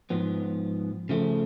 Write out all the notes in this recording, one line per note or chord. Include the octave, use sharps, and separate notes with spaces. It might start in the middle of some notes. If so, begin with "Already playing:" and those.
G#2 F3 B3
C#3 F3 A3